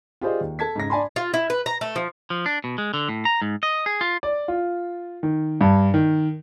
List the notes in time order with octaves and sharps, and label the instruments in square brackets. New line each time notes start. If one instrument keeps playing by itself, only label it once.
[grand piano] F4 G4 G#4 C5 D5 D#5
D#2
A4 A5 G#6 B6
G#2 C#3 A#6
D4 D5 G#5 A5 B5 C6
[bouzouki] F4
E4
B4
A#5
A3
F3
[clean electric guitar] F3
D4
B2
G#3
D3
A2
A#5
G#2
D#5
G#4
F4
[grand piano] D5
F4
D#3
G2
D#3